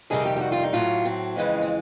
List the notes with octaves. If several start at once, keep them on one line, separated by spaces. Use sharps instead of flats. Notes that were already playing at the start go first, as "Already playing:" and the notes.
F2 C3 D#3 G3 G#4
G4
G4
F#4
F4
D#4
A2 F#3 F4
C4
F2 C#3 E3 G#3
C4